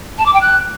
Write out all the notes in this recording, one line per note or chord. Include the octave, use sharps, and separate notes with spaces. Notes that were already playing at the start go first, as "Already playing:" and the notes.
A5
D6
G5
F#6